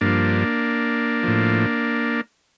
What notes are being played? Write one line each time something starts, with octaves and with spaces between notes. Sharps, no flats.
G2 F3 A#3 D4
A2 F3